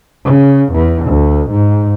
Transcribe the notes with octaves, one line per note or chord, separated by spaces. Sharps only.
C#3
E2
D2
G#2